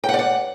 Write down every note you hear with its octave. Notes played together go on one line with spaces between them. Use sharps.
G5
F#5
D5
F#5